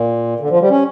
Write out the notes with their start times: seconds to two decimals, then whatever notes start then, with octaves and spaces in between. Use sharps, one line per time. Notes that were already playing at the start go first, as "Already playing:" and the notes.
Already playing: A#2
0.40 D3
0.50 F3
0.60 G3
0.70 C#4